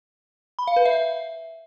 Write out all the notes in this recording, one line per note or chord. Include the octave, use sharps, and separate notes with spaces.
B5
F5
B4
E5